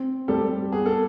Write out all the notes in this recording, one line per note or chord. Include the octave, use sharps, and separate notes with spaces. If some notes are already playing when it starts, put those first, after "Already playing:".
Already playing: C4
G3 G4 A4
B3 G#4
A4